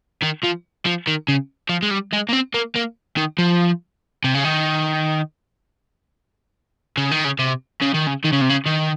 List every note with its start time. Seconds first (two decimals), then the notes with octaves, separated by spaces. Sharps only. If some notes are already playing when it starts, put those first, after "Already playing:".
0.22 D#3
0.43 F3
0.86 F3
1.07 D#3
1.28 C#3
1.69 F3
1.83 G#3
1.91 G3
2.13 G#3
2.29 A#3
2.33 C4
2.54 A#3
2.76 A#3
3.17 D#3
3.38 F3
4.24 C3
4.34 C#3
4.44 D#3
6.97 C#3
7.11 D#3
7.25 C#3
7.39 C3
7.81 C#3
7.94 D#3
8.07 C#3
8.24 D#3
8.32 C#3
8.41 C3
8.49 C#3
8.66 D#3